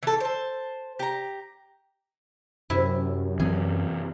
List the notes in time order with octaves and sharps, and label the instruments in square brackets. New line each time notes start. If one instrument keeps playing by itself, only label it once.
[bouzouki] E3 A4
C5 A5
G4 A#5
[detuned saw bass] F#2 [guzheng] C3 E4
[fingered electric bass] E3 C4 [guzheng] G#4